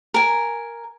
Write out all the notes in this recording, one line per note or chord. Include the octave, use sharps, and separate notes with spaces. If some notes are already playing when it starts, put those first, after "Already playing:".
A#4 G#5